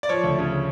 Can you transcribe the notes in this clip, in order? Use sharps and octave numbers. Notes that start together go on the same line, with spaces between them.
D5
F3 C#5
D2
C#3